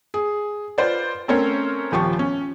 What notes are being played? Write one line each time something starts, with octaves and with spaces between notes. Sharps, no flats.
G#4
F4 B4 C5 D5
A3 C4 C#4 A#4 C5 C#5
D#1 F3 G4 C#6
C#4